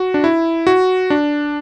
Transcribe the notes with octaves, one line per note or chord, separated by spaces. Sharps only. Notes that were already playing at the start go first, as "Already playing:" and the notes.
Already playing: F#4
D4
E4
F#4
D4